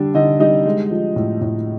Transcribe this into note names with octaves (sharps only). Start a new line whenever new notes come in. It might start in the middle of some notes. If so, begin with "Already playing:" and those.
Already playing: D3 G3 D4
D3 D#4 D#5
G3 D#4 D#5
G#3
F3
A2
A2